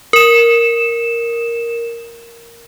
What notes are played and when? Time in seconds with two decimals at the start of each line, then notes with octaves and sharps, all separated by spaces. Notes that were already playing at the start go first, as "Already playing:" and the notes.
0.13 A#4 E7